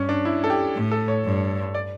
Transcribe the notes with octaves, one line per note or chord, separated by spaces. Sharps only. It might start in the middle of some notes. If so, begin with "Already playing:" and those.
Already playing: G2 C#4
D4
E4
A4
G4
A2
A4
C#5
G2
D5